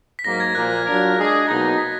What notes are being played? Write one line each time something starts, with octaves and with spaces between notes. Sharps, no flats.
B6
G#2 F#3 A#3 A#6
G#6
A#2 F3 A#3 F#6
F#6
F#3 D4 F4 A#4
G#3 D4 G#4
B2 F#3 A#3 D#4 A#6
B6